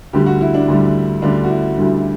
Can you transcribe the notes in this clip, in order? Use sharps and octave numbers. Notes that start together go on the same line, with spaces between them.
D2 D3 G3 G4
F#4
E4
D4
D2 D3 G3
D2 D3 G3 D4
F#4
E4
D2 D3 G3